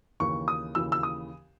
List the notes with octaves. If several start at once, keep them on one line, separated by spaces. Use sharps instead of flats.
D#2 C#3 E3 C#6
D#6
D#2 C#3 E3 E6
E6
D#6